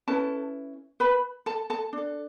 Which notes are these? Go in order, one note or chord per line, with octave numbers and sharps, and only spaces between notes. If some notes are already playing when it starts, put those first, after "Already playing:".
C#4 E4 A4 B4 A5
B4 B5
A4 A5
A4 A5
D4 A4